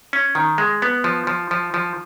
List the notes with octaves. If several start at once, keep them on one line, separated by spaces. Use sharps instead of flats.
C#4
D#3
G#3
B3
F3
F3
F3
F3